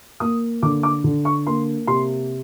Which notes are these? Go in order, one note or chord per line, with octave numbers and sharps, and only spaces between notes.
A#3 D#6
D3 D6
D6
D3
C#6
A#3 C6
C3 C6